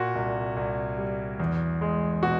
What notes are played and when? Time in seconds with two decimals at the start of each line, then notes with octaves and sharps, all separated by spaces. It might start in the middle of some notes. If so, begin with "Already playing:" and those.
Already playing: A#2 F#4
0.15 C2
0.57 C2
0.98 G3
1.40 E2
1.81 G#3
2.22 B2 F#4